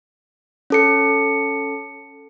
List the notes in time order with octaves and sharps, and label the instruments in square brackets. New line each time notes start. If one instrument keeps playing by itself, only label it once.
[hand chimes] C#4 A4 C#7